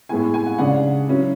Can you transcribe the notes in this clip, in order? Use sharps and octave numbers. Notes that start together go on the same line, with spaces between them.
A2 G#3 B3 E4 G#5
G#5
F#5
C#3 G#3 D4 F#5
F#3 C#4 E4